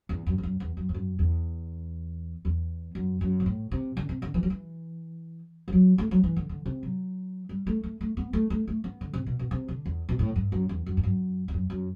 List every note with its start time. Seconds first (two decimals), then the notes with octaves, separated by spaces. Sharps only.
0.09 E2
0.26 F#2
0.38 E2
0.43 F#2
0.60 E2
0.77 F#2
0.89 G2
0.94 F#2
1.19 E2
2.45 E2
2.95 F#2
3.21 F#2
3.40 B2
3.46 A2
3.72 C3
3.97 D3
4.09 C3
4.22 D3
4.34 E3
4.43 F#3
4.50 E3
5.68 E3
5.73 F#3
5.98 A3
6.11 F#3
6.24 E3
6.36 D3
6.49 D3
6.66 C3
6.83 F#3
7.49 G3
7.67 A3
7.83 A3
8.01 A3
8.17 B3
8.33 A3
8.50 A3
8.68 A3
8.84 B3
9.01 D3
9.13 C3
9.26 B2
9.39 B2
9.51 C3
9.68 D3
9.86 E2
10.09 B2
10.19 A2
10.36 G2
10.52 F#2
10.69 E2
10.86 F#2
10.97 G2
11.03 F#2
11.48 E2
11.54 F#2
11.70 F#2